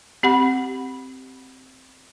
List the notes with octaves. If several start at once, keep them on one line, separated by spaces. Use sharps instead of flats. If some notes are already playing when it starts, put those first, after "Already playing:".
C4 G4 F#5 B5